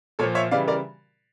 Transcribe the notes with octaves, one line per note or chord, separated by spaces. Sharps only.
A#2 F3 A4 C#5
C#5 E5
C#3 E3 G3 D5 F5
A#4 D5